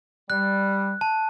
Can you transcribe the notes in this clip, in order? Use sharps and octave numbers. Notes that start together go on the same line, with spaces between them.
G3 F#6
A5